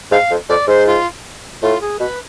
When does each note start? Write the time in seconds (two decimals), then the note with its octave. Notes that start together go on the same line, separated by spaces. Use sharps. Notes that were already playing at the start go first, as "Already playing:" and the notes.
0.11 G#2 F5
0.31 F2
0.49 F2 D5
0.67 G#2 C5
0.86 F4
1.62 A2 F4
1.81 G#4
1.99 B2 B4